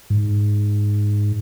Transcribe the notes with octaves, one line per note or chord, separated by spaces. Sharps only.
G#2